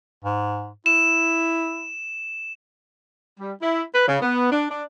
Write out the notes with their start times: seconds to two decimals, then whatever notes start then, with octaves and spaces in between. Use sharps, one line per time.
0.24 G#2
0.86 E4 E7
3.40 G3
3.62 E4
3.94 B4
4.08 C#3
4.22 B3
4.52 D4
4.70 D4